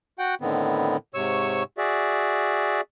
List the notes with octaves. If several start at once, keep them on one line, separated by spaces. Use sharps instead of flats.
F#4 F#5 G5
A2 D3 D#3 B3 C4
G#2 C3 C#5 C#6 E6
F#4 G#4 D5 E5